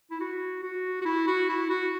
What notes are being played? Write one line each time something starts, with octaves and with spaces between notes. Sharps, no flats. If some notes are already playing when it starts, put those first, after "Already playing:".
E4
F#4
F#4
F#4
E4
F#4
E4
F#4